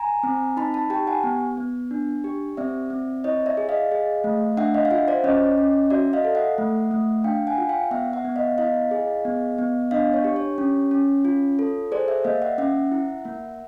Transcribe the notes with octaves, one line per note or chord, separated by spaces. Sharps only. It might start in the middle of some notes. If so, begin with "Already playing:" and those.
Already playing: G#5 A#5
C4
D#4 A5 B5
A5 B5
G4 G5 A5
F#5 G#5
B3
B3
D4
G4
C4 D5 E5
C4
E4 C#5 D#5
D5 E5
G#4
D#5 F5
G#4
A3
D4 E5 F#5
D#5 F5
F5
F4 E5 F#5
C5 D5
C#4 C#5 D#5
C#4
F#4 D5 E5
D#5 F5
A4
E5 F#5
A3
A3
D4 F5 G5
F#5 G#5
F4
F5 G5
B3 E5 F#5
E5 F#5
B3
D#5 F5
E4 D#5 F5
G#4
B3
B3
D4 D#5 F5
C#5
G4
C#5
C#4
C#4
F4
A4
G#4 C5 D5
D5 E5
A#3 D#5 F5
E5 F#5
C#4 E5 F#5
E4
A#3